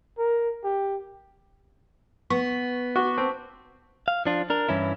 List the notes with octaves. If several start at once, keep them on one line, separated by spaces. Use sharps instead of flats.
A#4
G4
B3 C#6 B6
F#4 C#6 D6
C4 A5
F5
F3 D4 F4
D4 A#4
G2 E3 C#4 E4